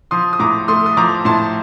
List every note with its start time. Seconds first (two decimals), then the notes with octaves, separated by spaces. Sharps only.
0.11 F3 C6 D#6
0.33 D#6
0.39 A2 A#5 D6
0.68 A3 C6 D#6
0.86 D#6
0.97 F3 A#5 D6
1.25 A2 A5 C6